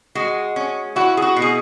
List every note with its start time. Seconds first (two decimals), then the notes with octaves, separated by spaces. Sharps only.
0.15 G#3 F#4
0.56 C#4
0.96 E4 F#4
1.17 G#4
1.22 F#4
1.36 B2
1.42 G#4